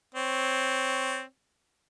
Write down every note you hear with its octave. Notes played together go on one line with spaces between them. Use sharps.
C4 C#5